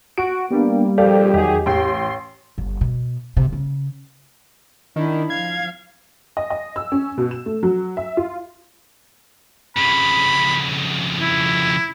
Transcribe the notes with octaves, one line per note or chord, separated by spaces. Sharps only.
F#4 D7
G3 A#3 B3 D4
A#1 F2 G4 A4 D5 F5
E2 D#3 F#3 G4 G#4 D#5
A1 G4 G5 C6
G1
B2
D2 C3
C#3
D#3 D4 E4
F3 F5 G#6
D#5
D#5
E6
C#4
B2
E7
A3
F#3
E5
F4
F2 C#3 B5
E4